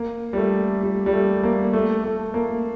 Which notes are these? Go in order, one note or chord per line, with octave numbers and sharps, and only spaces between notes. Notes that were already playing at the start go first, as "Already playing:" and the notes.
Already playing: A#3
G3
A3
G3
G3
A3
A#3
A3
A3
A#3